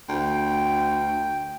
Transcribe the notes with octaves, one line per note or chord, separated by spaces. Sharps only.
D2 G5